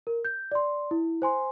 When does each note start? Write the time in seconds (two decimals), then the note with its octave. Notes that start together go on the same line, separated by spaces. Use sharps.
0.07 A#4
0.25 G6
0.52 D5 C6
0.91 E4
1.22 C5 G#5 C6